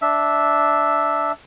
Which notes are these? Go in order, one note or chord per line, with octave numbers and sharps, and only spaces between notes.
D4 E5